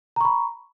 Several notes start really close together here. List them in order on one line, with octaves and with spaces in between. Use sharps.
A#5 C#6 B5